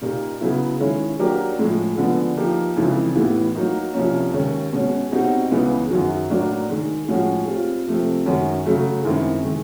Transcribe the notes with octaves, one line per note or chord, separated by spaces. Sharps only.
A#2 G3 A#3 D#4
C#3 F#3 B3 E4
D#3 G#3 C#4 E4
F#3 A#3 D4 G4 A#4
A2 F3 G#3
D3 F3 G#3 B3
F3 A#3 D#4 G4
F2 C#3 E3 G#3
A2 E3 G3 B3 E4
F#3 A#3 D#4
C2 C3 F3 A#3 C#4
D#2 D#3 G#3 C#4
B2 G#3 C#4
B2 G3 C4 D#4 F#4
C#2 C#3 E3 G#3 B3
F#2 D#3 F#3
A2 F#3 A#3 D4
G#2 D#3 G#3
A2 F3 G#3 C#4 F#4
G3 C4 F4
C3 F3 A3 C4
F#2 D#3 G#3 C#4 F#4
C#3 F#3 A3
F#2 D#3 G#3 C4 E4
D#3 G#3